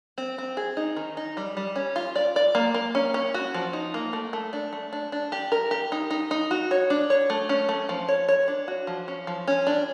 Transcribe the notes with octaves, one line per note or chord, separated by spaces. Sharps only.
C4
C4
G#4
D#4
D#3
D#4
G3
G3
C#4
F4
D5
D5
A#3
A#3
C#4
C#4
F#4
F3
D#4
A#3
A3
A3
D4
A3
D4
D4
G4
A#4
G4
D#4
D#4
D#4
F#4
C#5
D4
C#5
A3
C#4
A3
F3
C#5
C#5
D4
F#4
F3
C#4
F3
C#4
D4